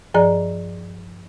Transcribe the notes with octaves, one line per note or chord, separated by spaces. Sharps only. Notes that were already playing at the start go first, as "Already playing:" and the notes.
G2 F3 G#4 D5 A#5